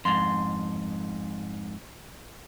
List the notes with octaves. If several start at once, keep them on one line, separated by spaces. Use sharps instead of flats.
F2 G#2 C6